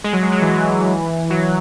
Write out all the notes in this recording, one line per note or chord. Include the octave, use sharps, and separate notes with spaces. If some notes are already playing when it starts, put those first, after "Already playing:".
G#3
F#3
G#3
F#3
E3
E3
F#3